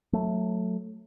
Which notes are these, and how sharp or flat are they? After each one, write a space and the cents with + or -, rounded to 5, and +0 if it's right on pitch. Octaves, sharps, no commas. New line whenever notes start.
F#3 -15 A3 +0